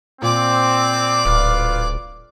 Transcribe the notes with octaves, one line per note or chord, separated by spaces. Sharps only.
A#2 C4 D5 D6
D1 F4 B4 F5